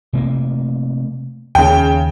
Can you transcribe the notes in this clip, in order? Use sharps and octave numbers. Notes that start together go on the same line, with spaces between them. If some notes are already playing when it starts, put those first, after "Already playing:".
C3 A3 A#3
D#2 C#3 G5